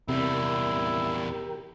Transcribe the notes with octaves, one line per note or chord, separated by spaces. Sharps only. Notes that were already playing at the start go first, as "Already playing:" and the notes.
E2 C3 G3 E4 G4 A#4